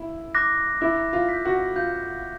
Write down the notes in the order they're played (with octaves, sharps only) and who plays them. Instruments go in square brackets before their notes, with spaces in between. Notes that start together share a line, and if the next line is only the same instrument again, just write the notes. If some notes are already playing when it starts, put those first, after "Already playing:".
Already playing: [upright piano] E4
[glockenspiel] D6 F#6 A#6
[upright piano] E4 [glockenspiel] D6
[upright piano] F4
[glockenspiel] G6 B6
[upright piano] F#4
[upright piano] F4 [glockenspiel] G6